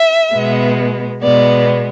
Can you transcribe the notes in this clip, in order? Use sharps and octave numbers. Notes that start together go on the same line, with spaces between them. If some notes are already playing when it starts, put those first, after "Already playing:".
Already playing: E5
B2 G#3 B3
B2 G#3 B3 D5